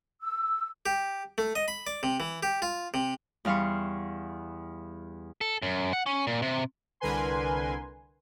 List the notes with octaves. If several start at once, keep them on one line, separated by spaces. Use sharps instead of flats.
E6
G4
A3
D#5
B5
D5
C3
E3
G4
F4
C3
E2 G3 F5 C6 C#6
A4
F#2
F#5
C#4
A#2
C3
C2 D3 A#4 B4 G#5 C6